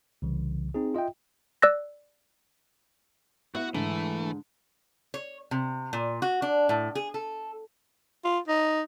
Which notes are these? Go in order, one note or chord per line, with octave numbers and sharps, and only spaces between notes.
C2 C#3 E3
C4 D#4 G#4
F4 D#5 E5 G5
D5 E6 F#6 A#6
B3 E4 F#4 F#5
G#2 D3 E3 A3
C#5
C3
A#2
F#4
D4
A2
G#4
A4
F4
D#4